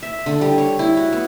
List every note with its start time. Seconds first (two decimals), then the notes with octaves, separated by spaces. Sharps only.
0.03 E5
0.26 D3
0.41 G3
0.58 C#5
0.79 E4
0.97 F#4
1.13 B3